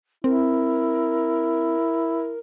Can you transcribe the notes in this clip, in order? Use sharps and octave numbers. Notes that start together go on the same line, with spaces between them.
C4 E4 A#4